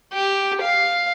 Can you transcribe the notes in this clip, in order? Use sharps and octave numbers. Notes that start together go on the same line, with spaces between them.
G4
F5